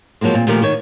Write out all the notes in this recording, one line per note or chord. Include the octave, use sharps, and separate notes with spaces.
F3 F#3 G#3 A#3 C4
A#2 C4
A#2 D#3 F3 A3 G4 A#4
D#3 D#4 C#5